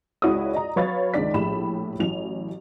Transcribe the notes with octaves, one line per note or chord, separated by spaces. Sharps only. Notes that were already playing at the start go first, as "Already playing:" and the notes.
C#2 E4 F#4 C#5 D5 D#6
D5 D#5 A#5
F#3 B4 C#5 F5 B5 A6
C#2 D#3 D4 D#4 D5 B6
A#1 A2 G4 B5 E7
A1 F#3 E4 F7